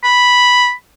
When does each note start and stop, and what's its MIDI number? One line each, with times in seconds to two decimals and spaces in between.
0.04 0.72 83